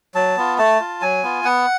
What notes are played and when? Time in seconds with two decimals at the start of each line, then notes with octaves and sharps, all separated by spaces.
0.15 F#3 A5
0.37 B3 F4
0.58 A3 A5
0.80 F4
1.01 F#3 G#5
1.23 B3 F4
1.44 B3 F#5